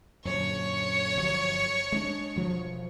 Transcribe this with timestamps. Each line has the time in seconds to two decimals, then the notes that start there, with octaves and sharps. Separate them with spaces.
0.25 F#2 A#2 D3 C#5 C#6
1.17 G1 F3 F#3
1.92 G#3 C4 D4
2.36 E1 F3